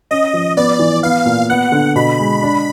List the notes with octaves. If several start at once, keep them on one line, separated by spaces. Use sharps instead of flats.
C#4 D#5
F3
B3 D5
E3
B3 F5
A#2
B3 F#5
D3
B2 B5
G#3
D4